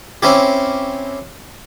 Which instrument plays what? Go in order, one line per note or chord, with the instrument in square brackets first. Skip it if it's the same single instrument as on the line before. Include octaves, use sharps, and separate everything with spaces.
[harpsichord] C4 C#4 E4 G4